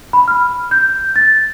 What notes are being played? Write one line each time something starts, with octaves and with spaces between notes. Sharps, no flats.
B5
F6
G6
A6